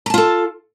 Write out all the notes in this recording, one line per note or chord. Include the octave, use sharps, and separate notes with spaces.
F4 A4 A5 A#5